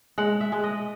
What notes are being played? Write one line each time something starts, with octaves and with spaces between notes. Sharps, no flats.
G#3 F#5
E5
G#3
D#5